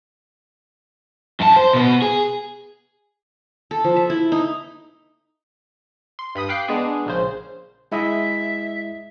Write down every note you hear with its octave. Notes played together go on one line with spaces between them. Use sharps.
F#2 A5
C5
B2 B3
G#4
A4
F3
E5
E4
D#4
C6
G2 B5 D#6
F5 G5 D6 F#6 C7
G#3 B3 D4 G#4
A#1 C#3 C5
G#3 E4 D#5 E5